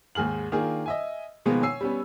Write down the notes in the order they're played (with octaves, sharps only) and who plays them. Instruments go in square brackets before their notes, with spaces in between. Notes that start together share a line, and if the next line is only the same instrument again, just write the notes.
[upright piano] D#2 G#2 G#4 F6 F#7
D#3 A#3 D4 F4 G#4
D#5 E5 G#5
B2 D#3 F3 G#3 A#3 B3
C#5 G#5 E6 C7
G3 B3 C#4